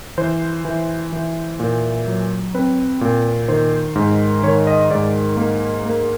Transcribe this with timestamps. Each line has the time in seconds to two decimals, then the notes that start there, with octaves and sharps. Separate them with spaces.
0.18 E3 C5
0.65 E3
1.12 E3
1.60 A#2
2.07 F#3
2.54 C4 B4
3.01 A#2
3.48 D#3 C5
3.95 G#2
4.43 D#3 C#5
4.67 D#5
4.91 G#2 D5
5.37 A#3
5.85 A#3